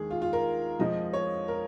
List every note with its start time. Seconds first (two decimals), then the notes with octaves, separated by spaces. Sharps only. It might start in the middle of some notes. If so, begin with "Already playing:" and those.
Already playing: D#2 D#3 G#3 G#4
0.11 F4
0.22 F4
0.33 A#4
0.79 F2 F3 G#3 D#5
1.13 C#5
1.48 A#4